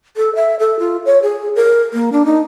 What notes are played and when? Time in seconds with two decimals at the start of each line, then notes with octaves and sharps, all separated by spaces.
0.17 A4
0.35 E5
0.59 A4
0.79 F4
1.05 C#5
1.22 G#4
1.56 A#4
1.94 A#3
2.12 D4
2.26 D#4